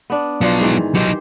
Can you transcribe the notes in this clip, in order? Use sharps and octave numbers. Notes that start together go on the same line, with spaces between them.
B3 D4
F3 F#3 B3 D4 F4
G#2 D#3 E3
F#3 D#4 G4 C5